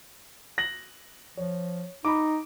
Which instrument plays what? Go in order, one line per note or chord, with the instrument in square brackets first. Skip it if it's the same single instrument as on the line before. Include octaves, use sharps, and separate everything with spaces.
[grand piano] A#6 F#7
[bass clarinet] F3 [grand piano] C#5
[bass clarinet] D#4 [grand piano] B5 D6